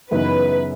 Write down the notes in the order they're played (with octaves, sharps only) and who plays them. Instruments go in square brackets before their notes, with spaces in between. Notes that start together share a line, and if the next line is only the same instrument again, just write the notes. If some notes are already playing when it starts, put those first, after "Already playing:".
[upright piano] F#2 C#3 E3 B3 D#4 [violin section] B4